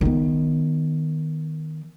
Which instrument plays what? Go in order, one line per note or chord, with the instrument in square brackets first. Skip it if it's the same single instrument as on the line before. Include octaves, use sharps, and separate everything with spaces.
[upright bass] D#3 B3